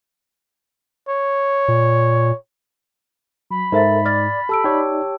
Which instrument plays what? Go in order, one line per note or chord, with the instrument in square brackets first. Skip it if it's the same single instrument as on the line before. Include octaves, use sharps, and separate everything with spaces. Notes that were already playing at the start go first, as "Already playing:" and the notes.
[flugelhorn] C#5
[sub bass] A#2
[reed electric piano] F#3 [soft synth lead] B5
[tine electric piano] G#2 [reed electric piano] A4 A#4 C5 [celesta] D#5 E5 A6
[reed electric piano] D5 [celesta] F6 A6
[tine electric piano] G4 [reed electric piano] A4 [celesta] A5 E6 D7
[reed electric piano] D#4 D5 [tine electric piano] G4 C#5 G5